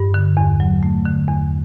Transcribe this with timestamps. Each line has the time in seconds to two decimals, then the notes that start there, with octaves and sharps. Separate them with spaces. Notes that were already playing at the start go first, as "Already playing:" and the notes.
Already playing: G2
0.14 D3
0.37 E2
0.60 F#3
0.83 A3
1.05 D3
1.28 E2